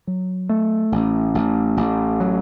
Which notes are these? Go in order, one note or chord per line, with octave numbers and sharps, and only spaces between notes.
F#3
A3
A1
A1
A1
F#3